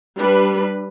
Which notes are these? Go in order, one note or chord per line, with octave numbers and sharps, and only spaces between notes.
G3 D4 B4